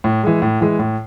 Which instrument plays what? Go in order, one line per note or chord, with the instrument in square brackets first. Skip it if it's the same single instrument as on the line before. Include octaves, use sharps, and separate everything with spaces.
[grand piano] A2
E3 G#3
A2
E3 G#3
A2